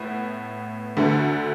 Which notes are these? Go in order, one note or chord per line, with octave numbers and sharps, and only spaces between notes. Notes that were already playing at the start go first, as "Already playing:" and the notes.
Already playing: A2 B3
D2 D3 A3